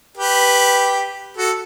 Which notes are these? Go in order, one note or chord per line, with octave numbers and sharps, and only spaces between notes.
G4 B4
F#4 A4